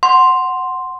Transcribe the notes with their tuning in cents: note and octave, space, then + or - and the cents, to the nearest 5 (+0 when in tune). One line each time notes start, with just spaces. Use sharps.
F#5 +0 C6 +0